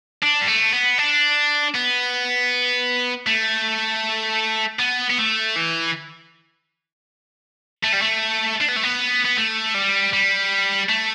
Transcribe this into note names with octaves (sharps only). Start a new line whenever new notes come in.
D4
G3
A3
B3
D4
B3
A3
B3
B3
A3
E3
A3
G3
A3
D4
B3
A3
B3
B3
A3
G3
G3
A3